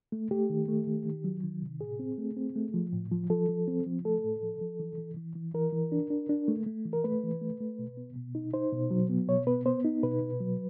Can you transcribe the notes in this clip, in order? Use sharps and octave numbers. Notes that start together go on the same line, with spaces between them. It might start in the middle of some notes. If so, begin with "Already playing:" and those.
A3
A3 G4
D#3
A3
D#3
D#3
F#3
D#3
C3
A2 G#4
C4
A3
C4
A3
F3
A2
F3
F3 A4
F3
C4
F3
A3 A4
A2
F3
F3
E3
E3
E3
E3
E3 A#4
E3
D4
D4
D4
A3
A3
E3
A#4
A3 B4
E3
A3
A3
B2
B3
B2
D#4
D#4 C5
B2
F#3
B3
B2 C#5
B3 B4
B3 C5
D#4
B2 B4
B2
F#3